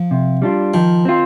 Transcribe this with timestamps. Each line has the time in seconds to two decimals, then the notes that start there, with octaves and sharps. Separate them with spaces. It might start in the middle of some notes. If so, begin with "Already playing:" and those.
Already playing: F3
0.11 C3
0.42 G3 D4 F4
0.74 D#3 F3
1.05 C4 F4